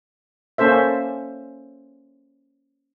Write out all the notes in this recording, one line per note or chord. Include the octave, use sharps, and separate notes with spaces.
A#3 C#4 A4 C5 E5